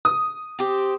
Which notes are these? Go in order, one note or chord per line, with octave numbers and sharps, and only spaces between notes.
D#6
C4 G4